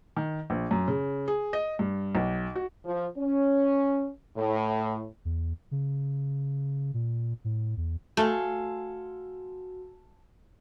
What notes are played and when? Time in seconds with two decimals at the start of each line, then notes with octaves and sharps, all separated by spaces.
0.17 D#3
0.50 A#1
0.71 F#2
0.88 C#3
1.28 G#4
1.53 D#5
1.79 G2
2.15 B1
2.55 F#4
2.85 F3
3.18 C#4
4.37 A2
5.25 E2
5.71 C#3
6.94 A#2
7.45 A2
7.77 E2
8.17 A3 F#4 A4 F5 G#5